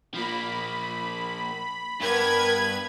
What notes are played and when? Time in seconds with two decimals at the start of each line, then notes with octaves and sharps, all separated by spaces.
0.14 F3 A#3 B5
2.01 G2 B3 A#4 B4 G#6